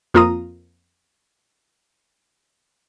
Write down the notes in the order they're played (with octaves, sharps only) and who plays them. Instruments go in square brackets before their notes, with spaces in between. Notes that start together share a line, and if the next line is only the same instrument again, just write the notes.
[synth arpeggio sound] F2 A#3 F4 A#5 D#6